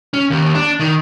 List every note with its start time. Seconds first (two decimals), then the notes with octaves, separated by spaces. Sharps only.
0.14 C#4
0.30 D#2
0.55 D4
0.80 D#3